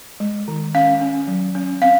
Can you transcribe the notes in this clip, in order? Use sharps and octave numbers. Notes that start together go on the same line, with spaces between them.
G#3
D#3
C#4 F5
C#4
F#3
C#4
C4 F5